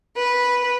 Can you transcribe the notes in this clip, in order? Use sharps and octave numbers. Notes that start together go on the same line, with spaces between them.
B4